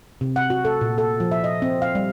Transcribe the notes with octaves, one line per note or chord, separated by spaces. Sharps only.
C3
F#5
F#4
A4
A#2
A4
F3
E5
D#5
C4
F5
G3